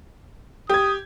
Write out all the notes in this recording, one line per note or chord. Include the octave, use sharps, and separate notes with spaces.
G4 D#6 G#6